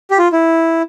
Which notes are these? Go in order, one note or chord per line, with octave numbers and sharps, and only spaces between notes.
G4
F4
E4